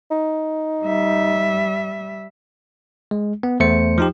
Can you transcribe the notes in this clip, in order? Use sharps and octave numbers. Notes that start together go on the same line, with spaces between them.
D#4
G3 E5
G#3
B3
E2 A3 C5 C#7
F3 D#4 G4